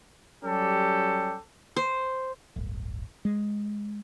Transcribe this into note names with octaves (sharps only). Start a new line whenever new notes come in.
F#3 G3 C#4 G4 A4
C5
D1 G1
G#3